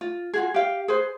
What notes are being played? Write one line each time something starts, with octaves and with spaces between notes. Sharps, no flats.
F4
F4 F#4 G#4
G4 F5
G#4 B4 C5